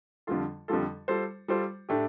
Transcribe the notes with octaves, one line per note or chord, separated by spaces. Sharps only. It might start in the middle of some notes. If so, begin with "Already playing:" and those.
F2 D3 G3 F4 A4
F2 D3 G3 F4 A4
G3 F4 A4 C5
G3 F4 A4 C5
A2 A3 D4 G4